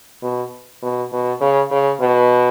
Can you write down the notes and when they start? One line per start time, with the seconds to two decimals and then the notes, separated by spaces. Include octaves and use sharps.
0.22 B2
0.82 B2
1.12 B2
1.41 C#3
1.71 C#3
2.01 B2